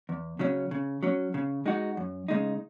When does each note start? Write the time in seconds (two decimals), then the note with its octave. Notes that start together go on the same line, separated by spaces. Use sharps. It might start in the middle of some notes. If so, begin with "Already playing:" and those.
0.09 E2
0.39 C#3 F#3 C#4
0.71 C#3
1.03 F#3 C#4
1.34 C#3
1.66 G#3 D#4 F#4
1.97 F#2
2.28 C#3 G#3 D#4